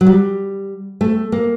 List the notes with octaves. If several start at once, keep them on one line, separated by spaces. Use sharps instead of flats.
F#3
G3
A3
A#3